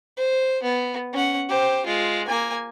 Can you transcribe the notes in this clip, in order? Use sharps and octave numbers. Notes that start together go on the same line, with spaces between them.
C5
B3
C#4 F#5
G4 C5
G#3 F4
A#3 G#5